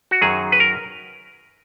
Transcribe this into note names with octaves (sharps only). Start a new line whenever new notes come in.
F#4
F#2 D#3 F#3 G#4
B4
A#4